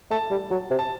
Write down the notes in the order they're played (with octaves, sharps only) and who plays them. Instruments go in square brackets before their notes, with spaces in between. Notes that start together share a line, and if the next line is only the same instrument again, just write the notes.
[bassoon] A3 [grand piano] A5
[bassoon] G3
F#3
C3
[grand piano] A5